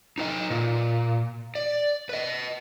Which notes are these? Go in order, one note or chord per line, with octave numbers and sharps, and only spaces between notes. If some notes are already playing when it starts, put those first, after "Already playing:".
D#4 B4 D#5
A#2
D5
B4 D#5